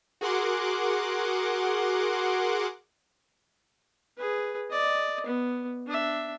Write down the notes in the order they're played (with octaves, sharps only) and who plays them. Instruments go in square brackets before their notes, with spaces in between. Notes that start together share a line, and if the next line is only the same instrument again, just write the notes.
[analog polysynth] F#4 G#4 A#4 F#5 C6 D6
[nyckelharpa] G#4 B4
D5 D#5
B3
D4 E5